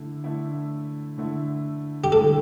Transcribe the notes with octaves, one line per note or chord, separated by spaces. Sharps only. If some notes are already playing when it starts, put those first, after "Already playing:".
Already playing: D3 A3 E4
D3 A3 E4
D3 A3 E4
G4
D3 A3 E4 A4